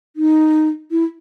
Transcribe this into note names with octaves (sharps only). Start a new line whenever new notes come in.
D#4
E4